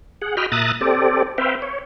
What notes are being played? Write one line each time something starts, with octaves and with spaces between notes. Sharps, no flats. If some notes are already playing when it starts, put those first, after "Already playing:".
G#4 F#5
F#4 D#5 G5 B5 F6
A#2 E5 A#5 D#6 F#6 A6
C4 G4 A4 D5
C4 B4 E5 F5 G5
C#5